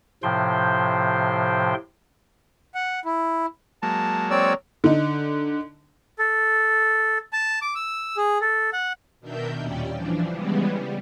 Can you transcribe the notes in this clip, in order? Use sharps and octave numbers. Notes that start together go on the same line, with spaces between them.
A2 C3 F3 C5 G5 C6
F#5
E4
F#3 G#3 A#3 A5
C4 C#5 D5 E6
D3 D#4
A4
A5
D6
E6
G#4
A4
F#5
B2 D#3 D4 A#4 E5 G6
D#2 A#2 G3 C#4 D5 G5
E3 F3 D4
C#3 E3 G3 G#3 B3
G3